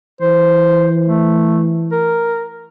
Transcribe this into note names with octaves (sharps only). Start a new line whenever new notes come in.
E3 C5
A3
A#4